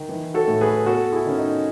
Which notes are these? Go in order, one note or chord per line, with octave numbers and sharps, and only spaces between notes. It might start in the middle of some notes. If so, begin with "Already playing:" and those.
Already playing: D#3
E3
F#4 A4
A2
G#4 B4
B4
B3 F#4 A4
E4 G#4
D#3 C#4
D#4